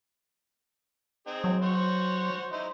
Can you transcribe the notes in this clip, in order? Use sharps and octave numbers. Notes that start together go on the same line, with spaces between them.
C4 D#4 G#4
F#3
F#4 C5 C#5
D#4 E4 C5